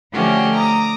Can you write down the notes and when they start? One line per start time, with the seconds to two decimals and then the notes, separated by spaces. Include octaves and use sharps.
0.13 D3 F3 A3 C#4 F#4 G4
0.55 A#5 D6 D#6